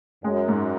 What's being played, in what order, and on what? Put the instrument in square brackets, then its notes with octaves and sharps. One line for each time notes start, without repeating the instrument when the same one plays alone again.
[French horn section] F#2 [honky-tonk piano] G#3
[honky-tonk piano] G#2